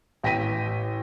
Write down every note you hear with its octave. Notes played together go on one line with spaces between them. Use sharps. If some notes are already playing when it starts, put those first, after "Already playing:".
A1 G5 A#6 B6 D#7